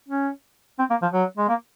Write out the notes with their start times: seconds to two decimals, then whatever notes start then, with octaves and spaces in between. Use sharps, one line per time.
0.09 C#4
0.79 C4
0.90 A#3
1.02 F3
1.13 F#3
1.38 G#3
1.49 A#3